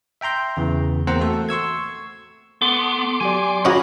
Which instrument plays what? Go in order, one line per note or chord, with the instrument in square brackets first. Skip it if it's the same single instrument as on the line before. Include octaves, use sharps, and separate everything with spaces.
[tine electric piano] E5 G5 A#5 C6 G6
E2 C#3 E3
E2 A#3 C4 C5 F#5 A#5
A3 F#4 A4
C6 C#6 E6 G#6
[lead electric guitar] B3 [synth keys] A4 [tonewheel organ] C6 D6
[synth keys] F#3 G4 D5 [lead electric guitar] G#5
[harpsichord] C#4 F#4 [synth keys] F5 G#5 A#5 [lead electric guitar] B5